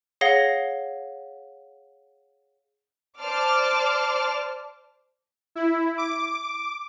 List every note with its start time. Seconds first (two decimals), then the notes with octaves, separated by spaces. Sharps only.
0.21 G#4 C#5 F5 F#5 A#6 G7
3.20 C5 D5 A5 D6 F6
5.55 E4
5.98 D6